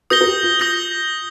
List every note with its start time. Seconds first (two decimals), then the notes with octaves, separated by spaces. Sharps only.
0.10 A#4 D#6 G6 A#6 G7
0.21 A#4
0.27 G4
0.43 F4
0.60 F4 D#6 G6 A#6 G7